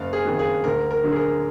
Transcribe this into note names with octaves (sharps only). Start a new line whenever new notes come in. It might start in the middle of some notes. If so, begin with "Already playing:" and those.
Already playing: F#1 F5
G#4
F2 D#3 F#3
G#4
D2 A#4
A#4
D3 F#3
G#4
A#4